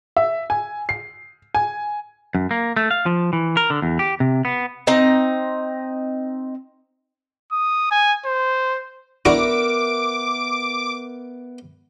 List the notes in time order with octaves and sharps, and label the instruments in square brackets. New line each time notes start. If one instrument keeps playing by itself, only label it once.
[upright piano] E5
G#5
C7
G#5
[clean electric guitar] F#2
A#3
A3
F5
F3
E3
A#4
D3
E2
G4
C3
B3
[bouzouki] C4 D#4 D#5
[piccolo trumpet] D#6
G#5
C5
[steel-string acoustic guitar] B3 A#4 E5 [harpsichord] D4 E4 F#4 [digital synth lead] D6